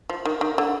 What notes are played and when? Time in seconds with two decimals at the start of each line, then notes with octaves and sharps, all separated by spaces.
0.09 F3
0.25 D#3
0.41 D#3
0.58 D3